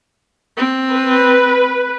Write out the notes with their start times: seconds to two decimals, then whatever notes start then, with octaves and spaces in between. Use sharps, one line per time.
0.57 C4
0.94 B4